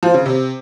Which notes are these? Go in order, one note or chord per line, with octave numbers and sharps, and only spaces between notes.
F3
C#3
C3